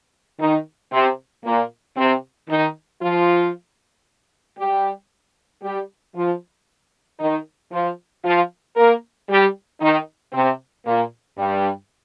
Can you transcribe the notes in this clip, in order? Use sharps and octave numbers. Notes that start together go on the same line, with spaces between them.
D#3 D#4
C3 C4
A#2 A#3
C3 C4
D#3 D#4
F3 F4
G3 G4
G3 G4
F3 F4
D#3 D#4
F3 F4
F3 F4
A#3 A#4
G3 G4
D#3 D#4
C3 C4
A#2 A#3
G2 G3